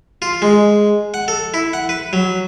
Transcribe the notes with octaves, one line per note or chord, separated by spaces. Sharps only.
F4
G#3
F#5
A4
E4
F#5
B4
F#3